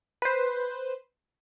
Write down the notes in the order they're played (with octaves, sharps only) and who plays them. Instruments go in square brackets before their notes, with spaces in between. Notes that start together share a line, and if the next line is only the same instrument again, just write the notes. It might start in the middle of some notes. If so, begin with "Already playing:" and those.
[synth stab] B4 C5